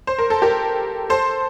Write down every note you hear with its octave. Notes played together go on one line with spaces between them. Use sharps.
C5
A#4
A4
G4 A#4
A4 C5